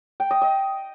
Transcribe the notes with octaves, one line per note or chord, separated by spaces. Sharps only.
G5
D#5
D#5